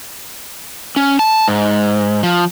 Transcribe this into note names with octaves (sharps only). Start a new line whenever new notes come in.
C#4
A5
G#2
F3